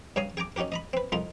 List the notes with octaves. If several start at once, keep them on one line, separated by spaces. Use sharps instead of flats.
G2 C#3 C#5 F5 A#5 D#6
G#4 G5 A#5 D6
C#4 D#4 F#4 G4 A#4
D#5 A#5 B5
C4 B4
C2 F2 D#4 F4 A#4